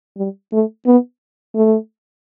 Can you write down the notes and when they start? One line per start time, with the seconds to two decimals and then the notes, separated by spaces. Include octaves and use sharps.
0.17 G3
0.53 A3
0.87 B3
1.55 A3